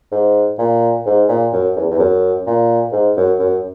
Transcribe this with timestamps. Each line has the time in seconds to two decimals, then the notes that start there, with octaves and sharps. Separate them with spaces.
0.12 G#2
0.58 A#2
1.06 G#2
1.28 A#2
1.53 F#2
1.76 E2
1.91 E2
1.99 F#2
2.46 A#2
2.92 G#2
3.17 F#2
3.39 F#2